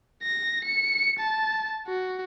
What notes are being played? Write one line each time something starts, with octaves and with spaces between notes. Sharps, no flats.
A#6
C#7
A5
F#4